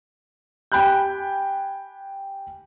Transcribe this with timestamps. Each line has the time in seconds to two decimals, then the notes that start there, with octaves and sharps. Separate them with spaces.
0.72 G4 G5 G#5 B5 F#6 G6